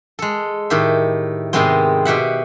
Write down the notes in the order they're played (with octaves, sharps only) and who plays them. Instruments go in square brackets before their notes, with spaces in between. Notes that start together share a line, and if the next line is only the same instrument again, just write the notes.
[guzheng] G#3 A4
A2 D#3 G4 E5
G#2 C3 D#3 G#3 B3 C4
B2 G4 E5 F#5